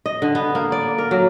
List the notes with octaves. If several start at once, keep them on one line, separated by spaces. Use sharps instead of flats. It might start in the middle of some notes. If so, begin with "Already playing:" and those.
D#5
D3
B3
A#3
D5
A#4
F#3